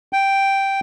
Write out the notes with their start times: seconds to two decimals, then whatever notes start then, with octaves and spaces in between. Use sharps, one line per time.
0.13 G5